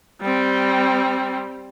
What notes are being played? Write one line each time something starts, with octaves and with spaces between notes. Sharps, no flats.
G3 C4